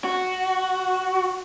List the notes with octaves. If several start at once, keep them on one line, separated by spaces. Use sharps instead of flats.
F#4